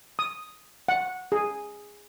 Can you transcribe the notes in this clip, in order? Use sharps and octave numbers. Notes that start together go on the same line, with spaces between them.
D#6
F#5
G#4